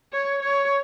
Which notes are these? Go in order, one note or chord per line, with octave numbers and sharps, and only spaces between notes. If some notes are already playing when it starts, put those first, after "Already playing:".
C#5
C#5